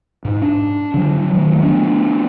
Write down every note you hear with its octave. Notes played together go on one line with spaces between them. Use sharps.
G#2
D4
D3 F#3
D#3 F#3 A3
A3 B3 C4 D4